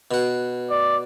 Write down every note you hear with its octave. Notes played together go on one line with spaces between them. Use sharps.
B2 F#5
D5